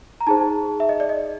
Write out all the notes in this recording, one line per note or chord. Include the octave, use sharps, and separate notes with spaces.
A#5
D#4 G#4 C5 A5
E5
D#5
D5
D#5